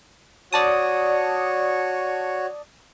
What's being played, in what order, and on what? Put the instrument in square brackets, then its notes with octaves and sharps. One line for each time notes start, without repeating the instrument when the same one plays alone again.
[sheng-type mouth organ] F#4 C#5 [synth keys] D5 A5 D#6